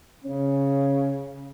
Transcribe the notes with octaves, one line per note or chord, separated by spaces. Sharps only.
C#3 C#4